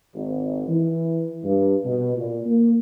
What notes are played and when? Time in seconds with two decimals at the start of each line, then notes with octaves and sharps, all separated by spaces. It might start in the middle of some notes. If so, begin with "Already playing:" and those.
0.14 G#1
0.68 E3
1.43 G2
1.85 B2
2.17 A#2
2.46 A#3